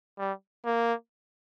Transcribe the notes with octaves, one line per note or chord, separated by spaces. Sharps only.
G3
A#3